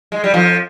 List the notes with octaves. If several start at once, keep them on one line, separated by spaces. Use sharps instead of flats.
G#3
G3
F2 F3